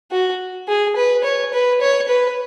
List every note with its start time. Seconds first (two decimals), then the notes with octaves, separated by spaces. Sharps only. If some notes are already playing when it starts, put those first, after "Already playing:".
0.11 F#4
0.68 G#4
0.96 B4
1.24 C#5
1.53 B4
1.81 C#5
2.09 B4